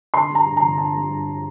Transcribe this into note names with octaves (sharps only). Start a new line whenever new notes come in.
D3 C6
G3
A#5
G2
A#5
G1
D3 A5
G3
G2